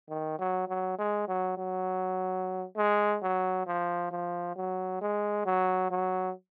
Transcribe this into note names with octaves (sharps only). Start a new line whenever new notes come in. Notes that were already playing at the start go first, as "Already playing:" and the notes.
D#3
F#3
F#3
G#3
F#3
F#3
G#3
F#3
F3
F3
F#3
G#3
F#3
F#3